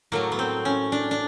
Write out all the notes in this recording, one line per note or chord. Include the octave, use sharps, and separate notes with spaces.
A2 F#3 A3 A#3
B3
C4
C#4
D4
D4